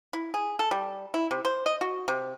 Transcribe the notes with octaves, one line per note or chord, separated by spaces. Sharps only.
E4
G#4
A4
G3
E4
C3
C5
D#5
F#4
C3